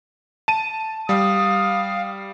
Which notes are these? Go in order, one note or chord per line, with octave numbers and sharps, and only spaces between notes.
A5 D#7
G3 F5 D#6